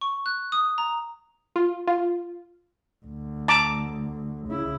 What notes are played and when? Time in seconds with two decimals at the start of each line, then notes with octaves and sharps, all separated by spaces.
0.01 C#6
0.26 F#6
0.52 D#6
0.78 A#5
1.56 F4
1.87 F4
3.05 D2
3.48 A5 A#5 D6
4.48 C#3 E4